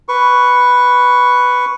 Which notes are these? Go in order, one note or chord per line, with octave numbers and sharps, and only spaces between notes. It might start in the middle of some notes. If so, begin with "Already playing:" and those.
B4 C#6